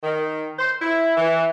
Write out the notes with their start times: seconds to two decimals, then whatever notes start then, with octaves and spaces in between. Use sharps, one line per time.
0.03 D#3
0.58 C5
0.80 E4
1.16 E3